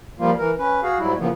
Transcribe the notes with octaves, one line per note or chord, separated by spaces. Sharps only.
F3 G3 A#3 F4
E3 A#4
C#4 B4
F#4 G#4 F5
G#2 F#3 G3 E4
C#3 E3 F3 A#3 B3